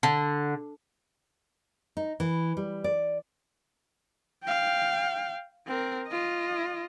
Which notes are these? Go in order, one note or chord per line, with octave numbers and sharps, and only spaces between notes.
D3
D#4
E3
G3
D5
F5 G5
C4 A#4
F4 D#5